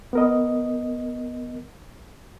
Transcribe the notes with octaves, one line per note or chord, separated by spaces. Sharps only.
B3 A#4 D#5